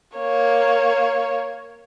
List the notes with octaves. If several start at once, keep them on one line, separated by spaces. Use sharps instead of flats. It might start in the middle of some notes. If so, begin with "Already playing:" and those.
A#3 C#5